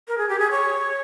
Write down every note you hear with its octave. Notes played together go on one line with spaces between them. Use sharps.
A#4
G#4
G4
G#4
C#5